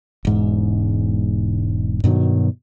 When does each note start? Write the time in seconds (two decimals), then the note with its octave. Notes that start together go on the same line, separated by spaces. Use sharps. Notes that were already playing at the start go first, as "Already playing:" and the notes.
0.25 E1 G#2
2.04 G2 B2 D#3 F#3